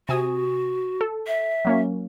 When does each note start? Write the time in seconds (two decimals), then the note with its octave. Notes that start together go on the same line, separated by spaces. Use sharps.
0.09 C3 F#4 G#5 D#6
1.01 A4
1.27 E5
1.65 F#3 A#3 C#4